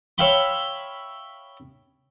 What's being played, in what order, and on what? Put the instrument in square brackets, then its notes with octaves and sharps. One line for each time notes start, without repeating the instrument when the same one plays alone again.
[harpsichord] C#5 E5 F5 G5 B5 C6